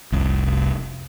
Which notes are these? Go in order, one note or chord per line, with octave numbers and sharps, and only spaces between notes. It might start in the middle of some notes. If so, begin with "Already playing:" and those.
F1 C2